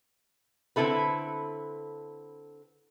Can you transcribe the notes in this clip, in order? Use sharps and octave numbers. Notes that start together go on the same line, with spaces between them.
D3 C4 E4 A4 B4